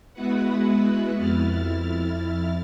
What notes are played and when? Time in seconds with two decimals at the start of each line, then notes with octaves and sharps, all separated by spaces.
0.13 G#3 B3 E4 F#4 B4 F#5
1.17 F2 E4 F6 A6